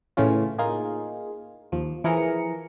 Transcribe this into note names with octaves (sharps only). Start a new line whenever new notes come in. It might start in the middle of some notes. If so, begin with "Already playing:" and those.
A2 C#3 E3 C#4 F4
A#3 D#4 F4 G#4
D#2 F3
E3 F3 G#4 A#4 A#5 C#7